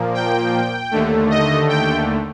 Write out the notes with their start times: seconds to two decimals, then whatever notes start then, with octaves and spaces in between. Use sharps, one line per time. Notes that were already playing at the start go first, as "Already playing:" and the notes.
Already playing: A#2 F3 A#3
0.14 G5
0.91 D#2 D3 A3
1.30 D#5
1.69 G5